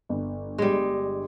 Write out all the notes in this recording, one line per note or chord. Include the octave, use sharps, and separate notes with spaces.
G1
G3 G#3